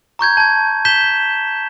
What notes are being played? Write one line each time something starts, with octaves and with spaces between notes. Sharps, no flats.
A#5 C#6 G6 G#6
A5 G#6
G6 B6 E7 G7